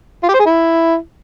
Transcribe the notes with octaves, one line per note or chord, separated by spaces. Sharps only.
F4
G4
C5
G#4
E4